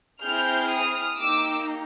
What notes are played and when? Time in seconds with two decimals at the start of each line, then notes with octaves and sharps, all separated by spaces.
0.21 C4 E4 G#4 F6 G6
0.69 D#6 F6
1.17 A#3 D#4 G4 D6 E6